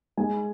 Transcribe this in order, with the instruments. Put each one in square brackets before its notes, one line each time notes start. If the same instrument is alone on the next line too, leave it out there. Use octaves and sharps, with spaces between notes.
[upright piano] G#3 G#5